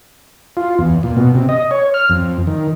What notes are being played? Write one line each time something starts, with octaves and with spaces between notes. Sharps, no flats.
F4
E2
A#2
B2
C3
D#5
C#5
F6
F2
D#3